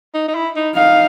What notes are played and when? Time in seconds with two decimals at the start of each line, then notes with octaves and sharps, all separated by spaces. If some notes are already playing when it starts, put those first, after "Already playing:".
0.14 D#4
0.28 D#4
0.35 E4
0.56 D#4
0.76 D#4 F5